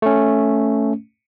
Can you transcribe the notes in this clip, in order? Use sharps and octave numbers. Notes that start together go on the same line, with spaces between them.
A3 C#4